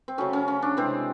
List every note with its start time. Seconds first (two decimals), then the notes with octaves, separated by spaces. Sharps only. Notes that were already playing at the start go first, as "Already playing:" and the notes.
0.08 C4
0.18 C#3 F#3 A3 C#4
0.33 C#4
0.48 C#4
0.62 D4
0.77 C3 E3 G#3 C4